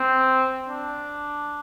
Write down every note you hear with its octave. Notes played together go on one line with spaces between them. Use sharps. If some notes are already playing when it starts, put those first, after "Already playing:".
Already playing: C4
D4